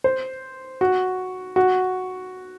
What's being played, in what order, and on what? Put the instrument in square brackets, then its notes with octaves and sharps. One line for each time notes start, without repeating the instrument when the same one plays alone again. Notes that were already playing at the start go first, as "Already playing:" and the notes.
[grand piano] C5
F#4
F#4